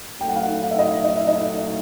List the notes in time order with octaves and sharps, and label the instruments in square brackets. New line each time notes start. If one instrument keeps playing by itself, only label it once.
[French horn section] A#2 F#3 A3 [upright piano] G5
[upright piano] F#5
F5
F#5
F5
E5
D#5
E5
D#5
E5
D#5